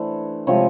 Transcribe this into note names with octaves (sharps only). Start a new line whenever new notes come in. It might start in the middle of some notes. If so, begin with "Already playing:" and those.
Already playing: E3 A3 D4 C5
C3 F3 G#3 C#5